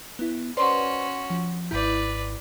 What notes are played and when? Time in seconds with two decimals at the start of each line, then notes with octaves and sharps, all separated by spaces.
0.19 B3 E4
0.57 C#4 F#4 B4 C5 D5 C6
1.30 F3
1.71 G#1 G#2 E4 B4 D5 G6